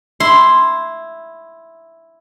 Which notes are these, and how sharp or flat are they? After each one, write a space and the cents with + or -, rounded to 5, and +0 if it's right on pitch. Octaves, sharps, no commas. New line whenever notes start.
E4 +0 C6 +0